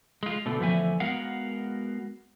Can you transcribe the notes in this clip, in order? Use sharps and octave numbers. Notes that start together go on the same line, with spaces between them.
G#3 F4
B2 D3 A3
E2 D3 F3 A3 E5 G#5
G#3 B3 F#4 A#4 F5 F#5